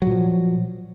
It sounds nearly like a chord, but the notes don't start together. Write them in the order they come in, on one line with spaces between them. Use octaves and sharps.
F#3 A#2 F3